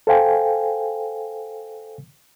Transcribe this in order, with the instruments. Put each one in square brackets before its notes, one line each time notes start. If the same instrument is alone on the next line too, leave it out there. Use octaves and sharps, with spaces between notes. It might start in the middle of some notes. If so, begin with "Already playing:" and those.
[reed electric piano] A4 C5 F5 G5 G#5